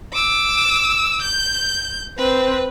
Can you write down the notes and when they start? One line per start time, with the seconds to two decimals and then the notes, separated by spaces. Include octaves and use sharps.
0.13 D6 E6
1.22 G6
2.18 C4 B4